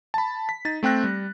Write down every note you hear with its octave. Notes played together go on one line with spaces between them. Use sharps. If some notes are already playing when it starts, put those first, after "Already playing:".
A5 B5
B6
D#4 A6
A3 C4 G5 F#6 A#6
G3